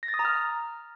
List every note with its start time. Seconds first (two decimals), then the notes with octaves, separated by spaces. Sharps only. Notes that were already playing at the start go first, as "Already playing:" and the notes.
0.03 A#6
0.08 A6
0.14 D#6
0.19 A#5
0.25 F6